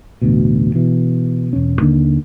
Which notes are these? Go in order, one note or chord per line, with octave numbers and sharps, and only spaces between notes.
A1 D2 B2
B2 E3
E1 C#4
D#2 D3 D#3 A#3